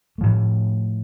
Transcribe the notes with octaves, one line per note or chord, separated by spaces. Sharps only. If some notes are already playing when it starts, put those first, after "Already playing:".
A2 F3 A3